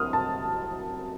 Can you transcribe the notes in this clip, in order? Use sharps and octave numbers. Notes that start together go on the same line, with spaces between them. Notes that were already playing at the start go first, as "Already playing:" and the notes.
Already playing: C2 F#3 C6 D#6 F6
A5